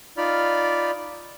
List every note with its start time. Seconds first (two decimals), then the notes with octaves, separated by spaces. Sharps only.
0.17 D#4 F4 D5 B5 F6